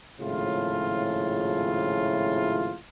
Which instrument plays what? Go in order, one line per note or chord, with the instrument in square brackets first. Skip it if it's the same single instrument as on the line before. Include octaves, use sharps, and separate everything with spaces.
[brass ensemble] G#1 A2 C#3 F3 E4 F4